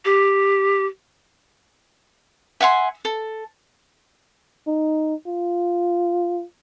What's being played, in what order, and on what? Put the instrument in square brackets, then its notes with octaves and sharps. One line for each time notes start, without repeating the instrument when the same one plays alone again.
[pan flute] G4
[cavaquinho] E5 F#5 G#5 C6
A4
[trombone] D#4
F4